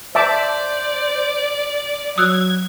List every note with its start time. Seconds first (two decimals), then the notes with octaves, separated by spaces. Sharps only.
0.15 C5 D5 E5 A5 D6
2.18 F#3 D#6 E6 F#6 G#6